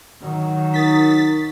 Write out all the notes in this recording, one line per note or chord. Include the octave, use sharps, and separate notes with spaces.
D#3 F#3
D#4 A#4 D#6 A6 B6